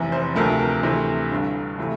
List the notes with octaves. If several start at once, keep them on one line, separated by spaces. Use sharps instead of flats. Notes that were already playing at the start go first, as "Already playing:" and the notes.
Already playing: F1 E2 C3 E3
C5
D2 C3 F3 A3 A#4
A#4
D2 C3 E3 A3 C5
G1 G2 D3
C3 E3 A3